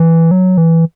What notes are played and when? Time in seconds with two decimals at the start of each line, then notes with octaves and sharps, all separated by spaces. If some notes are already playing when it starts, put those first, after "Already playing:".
Already playing: E3
0.31 F#3
0.57 E3